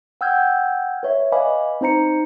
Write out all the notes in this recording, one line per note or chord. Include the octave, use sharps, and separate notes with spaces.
F#5 G5 E6 F6 G6 G#6
B4 C#5 E5
B4 D#5 F5 G#5 B5 D6
C4 D#4 C5 A#5 C#7